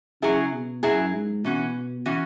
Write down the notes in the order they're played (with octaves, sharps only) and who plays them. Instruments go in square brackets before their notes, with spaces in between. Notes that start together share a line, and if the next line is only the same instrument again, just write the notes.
[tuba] C#3 [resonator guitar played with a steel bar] F#3 E4 G#4
[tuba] B2
[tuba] F#2 [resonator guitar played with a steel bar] F#3 E4 G#4
[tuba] G#2
[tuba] B2 [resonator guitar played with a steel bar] E3 C#4 F#4
[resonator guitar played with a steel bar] E3 C#4 F#4